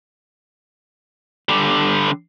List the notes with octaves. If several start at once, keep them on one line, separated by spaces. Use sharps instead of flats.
D3 G3